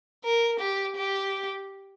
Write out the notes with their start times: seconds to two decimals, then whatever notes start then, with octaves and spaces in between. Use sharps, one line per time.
0.25 A#4
0.60 G4
0.97 G4